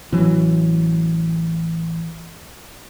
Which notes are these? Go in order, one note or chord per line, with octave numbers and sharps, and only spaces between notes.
A1 E3 F#3